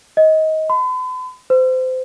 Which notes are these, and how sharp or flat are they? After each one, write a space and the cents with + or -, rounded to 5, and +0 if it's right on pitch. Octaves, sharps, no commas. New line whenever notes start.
D#5 +20
B5 +45
C5 -25